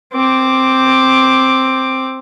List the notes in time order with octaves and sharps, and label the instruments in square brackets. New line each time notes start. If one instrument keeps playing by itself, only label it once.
[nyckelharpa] C4 D6